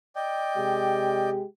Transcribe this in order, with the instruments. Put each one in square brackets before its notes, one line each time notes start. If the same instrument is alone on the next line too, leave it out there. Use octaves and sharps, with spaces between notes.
[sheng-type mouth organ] D5 D#5 G5
[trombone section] C3 G#3 G4